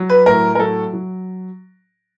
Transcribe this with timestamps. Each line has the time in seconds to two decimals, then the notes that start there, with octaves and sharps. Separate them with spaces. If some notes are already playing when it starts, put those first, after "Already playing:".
Already playing: F#3
0.10 B4
0.26 A2 A#4
0.55 A#4
0.59 F#3 A4
0.93 F#3